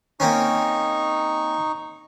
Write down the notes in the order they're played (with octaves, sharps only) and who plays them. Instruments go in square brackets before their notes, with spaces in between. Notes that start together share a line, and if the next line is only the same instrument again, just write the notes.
[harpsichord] A#3 C4 C#4 [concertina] D#4 C#6